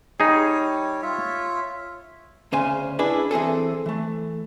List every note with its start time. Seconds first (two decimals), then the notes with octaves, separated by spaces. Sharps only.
0.20 G3 D#4 G#4 C#5
1.02 F4 C#5 E5
2.52 D2 C#3 C5 G#5
2.99 D4 E4 G#4 B4
3.31 E3 C4 G#4 A4
3.86 E3 A3